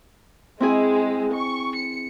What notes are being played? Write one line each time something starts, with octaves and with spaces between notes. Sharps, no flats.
G#3 C4 E4 G#4
C#6
C#7